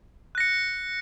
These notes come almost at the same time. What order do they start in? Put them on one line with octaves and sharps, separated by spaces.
F#6 A#6 C#7